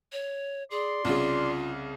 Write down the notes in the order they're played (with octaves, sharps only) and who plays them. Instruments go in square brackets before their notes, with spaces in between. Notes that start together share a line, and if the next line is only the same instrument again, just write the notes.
[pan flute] C#5
[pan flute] G#4 [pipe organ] D5 C6
[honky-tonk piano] C2 C#3 [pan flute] F4